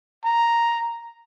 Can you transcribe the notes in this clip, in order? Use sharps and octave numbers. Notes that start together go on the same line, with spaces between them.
A#5